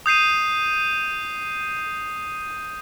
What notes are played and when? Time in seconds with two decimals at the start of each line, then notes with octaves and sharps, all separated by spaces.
0.06 D#6 G6 C7 D#7